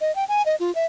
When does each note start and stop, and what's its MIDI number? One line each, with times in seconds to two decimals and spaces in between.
0.01 0.14 75
0.15 0.25 79
0.28 0.42 80
0.46 0.56 75
0.60 0.74 65
0.75 0.86 76